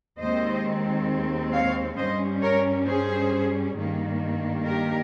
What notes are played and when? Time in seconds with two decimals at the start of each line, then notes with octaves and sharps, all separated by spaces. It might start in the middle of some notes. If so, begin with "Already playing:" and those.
0.19 D#2 D#3 G#3 C4 C5 D#5
1.53 C#5 F5
1.97 G2 G3 C#4 C5 D#5
2.42 A#4 C#5
2.86 G#4 C5
3.76 G2 D#3 A#3
4.65 G4 A#4